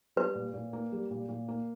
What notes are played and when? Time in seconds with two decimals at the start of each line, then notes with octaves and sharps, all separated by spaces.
0.16 G3 B4
0.35 A#2
0.54 A#2
0.73 A#3
0.92 G3
1.11 A#2
1.29 A#2
1.48 A#3